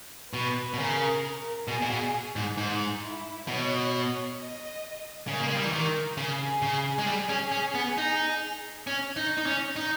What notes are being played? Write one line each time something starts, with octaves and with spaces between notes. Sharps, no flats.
B2 B4
B2
C#3 A#4
B2 G#4
A#2
B2
G#2
G#2
E4
B2 C#5
D#5
C#3 A#4
A#3
G#3
G3
E3
D#3 A#4
C#3 G#4
C#3
G#3
G3
C#4
C#4
B3
D#4
C#4
D#4
D#4
C#4
D#4